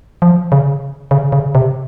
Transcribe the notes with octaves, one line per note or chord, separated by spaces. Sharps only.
F3
C#3
C#3
C#3
C3